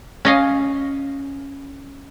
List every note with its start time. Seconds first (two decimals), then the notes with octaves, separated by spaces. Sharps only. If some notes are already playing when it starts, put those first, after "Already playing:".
0.25 C#4 D#5 F5